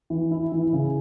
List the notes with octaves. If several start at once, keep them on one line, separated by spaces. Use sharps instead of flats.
E3
E4
E3
C#3